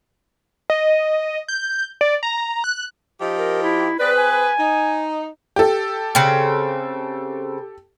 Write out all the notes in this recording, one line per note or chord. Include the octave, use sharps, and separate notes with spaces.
D#5
G6
D5
A#5
F#6
F3 D#4 G4
A#4
E4
C4 G#4 B4 D5
G#5
D#4
G4 A4
C#3 C4